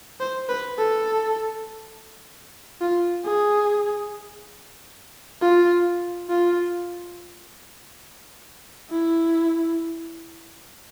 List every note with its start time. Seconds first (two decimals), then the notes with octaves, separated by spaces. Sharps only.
0.20 C5
0.49 B4
0.78 A4
2.81 F4
3.25 G#4
5.42 F4
6.29 F4
8.91 E4